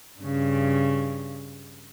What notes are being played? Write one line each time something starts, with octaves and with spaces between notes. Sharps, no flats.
G2 C#3